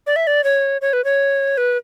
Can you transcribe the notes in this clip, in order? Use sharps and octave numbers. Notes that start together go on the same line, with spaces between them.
D5
E5
D5
C#5
C#5
B4
C#5
B4